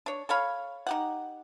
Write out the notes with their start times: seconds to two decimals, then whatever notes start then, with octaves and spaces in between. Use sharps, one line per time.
0.06 D4 C#5
0.29 A4 C#5 F5 B5
0.87 D#4 G4 F#5